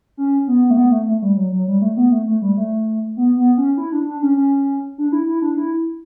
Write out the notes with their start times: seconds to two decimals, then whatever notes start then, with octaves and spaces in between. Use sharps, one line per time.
0.17 C#4
0.48 B3
0.70 A3
0.77 B3
0.91 A3
1.06 A3
1.22 G3
1.37 F#3
1.52 F#3
1.68 G3
1.82 A3
1.97 B3
2.12 A3
2.28 A3
2.42 G3
2.57 A3
3.17 B3
3.37 B3
3.58 C#4
3.78 E4
3.92 D4
4.07 D4
4.22 C#4
4.37 C#4
4.98 D4
5.12 E4
5.28 E4
5.42 D4
5.57 E4